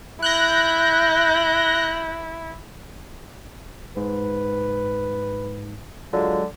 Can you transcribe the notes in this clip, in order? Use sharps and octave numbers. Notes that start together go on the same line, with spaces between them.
E4 F#6 G6 A#6
G#2 B4
D3 F#3 G#3 F4